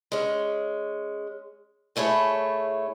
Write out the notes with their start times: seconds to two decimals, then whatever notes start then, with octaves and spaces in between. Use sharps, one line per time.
0.12 G#3 C#4
1.96 A2 A3 E4 G#4 C#5